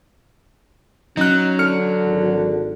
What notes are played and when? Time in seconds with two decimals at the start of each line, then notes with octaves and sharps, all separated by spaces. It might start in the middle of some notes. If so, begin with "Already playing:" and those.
1.17 F#3 C#4 D#4 F#6
1.59 D3 F6 C#7
2.05 G#1